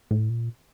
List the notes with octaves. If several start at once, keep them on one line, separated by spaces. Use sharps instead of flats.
A2
A#2